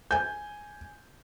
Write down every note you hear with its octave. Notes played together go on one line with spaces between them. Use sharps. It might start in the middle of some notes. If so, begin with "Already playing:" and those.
G#5 G6